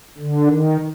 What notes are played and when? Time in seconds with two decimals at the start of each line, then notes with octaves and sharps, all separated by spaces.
0.18 D3
0.47 D#3